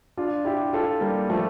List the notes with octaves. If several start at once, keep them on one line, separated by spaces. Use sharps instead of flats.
D4 F4
E4 G4
F4 A4
G3 A#3
F3 A3